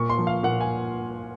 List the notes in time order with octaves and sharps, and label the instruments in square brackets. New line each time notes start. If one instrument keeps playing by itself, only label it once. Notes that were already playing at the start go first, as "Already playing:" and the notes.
Already playing: [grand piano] A#2 C#6
C6
F3
F5
A#2 F#5
G#5